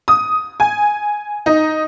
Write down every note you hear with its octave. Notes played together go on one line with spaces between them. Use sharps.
D#6
G#5
D#4